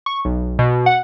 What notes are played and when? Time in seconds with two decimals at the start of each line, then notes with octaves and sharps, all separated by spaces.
0.06 C#6
0.25 B1
0.59 B2
0.86 F#5